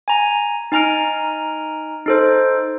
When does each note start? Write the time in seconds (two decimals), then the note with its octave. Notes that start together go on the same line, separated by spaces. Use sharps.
0.08 G#5 A#5
0.72 D#4 G#5 A#5 F6 D7
2.06 D#4 A4 C5